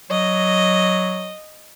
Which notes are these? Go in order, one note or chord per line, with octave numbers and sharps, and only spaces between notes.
F#3 D#5